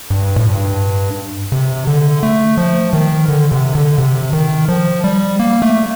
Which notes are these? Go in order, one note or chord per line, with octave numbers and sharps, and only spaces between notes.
G2
A2
G2
C3
D3
A3
F3
D#3
D3
C3
D3
C3
D#3
F3
G3
A#3
A3